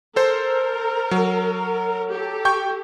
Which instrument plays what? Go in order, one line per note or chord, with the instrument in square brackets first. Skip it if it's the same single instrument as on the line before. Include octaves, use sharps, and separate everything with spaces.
[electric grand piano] A4 C5 [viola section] A#4
[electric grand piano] F#3
[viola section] G4 A4
[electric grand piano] G5 C#6 G6